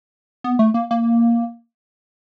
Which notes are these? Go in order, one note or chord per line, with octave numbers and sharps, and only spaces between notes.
B3
A3
A#3
A#3